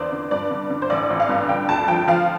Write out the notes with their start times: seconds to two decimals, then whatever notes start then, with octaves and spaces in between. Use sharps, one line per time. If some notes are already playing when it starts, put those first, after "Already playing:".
Already playing: E2 D3 C5 D5
0.12 D3
0.31 G2 D5
0.51 D3
0.70 D3
0.82 C5
0.90 A1 D5
1.10 A1
1.20 F5
1.29 G2
1.49 D3 G5
1.69 D2 A5
1.88 F3 G5
2.08 F3 F5